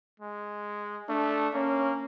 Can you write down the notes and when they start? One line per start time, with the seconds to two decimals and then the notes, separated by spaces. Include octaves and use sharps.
0.20 G#3
1.09 A3 D4
1.54 A#3 C#4